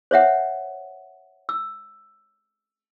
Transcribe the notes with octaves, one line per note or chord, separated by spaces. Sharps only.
C5 C#5 E5 F#5
E6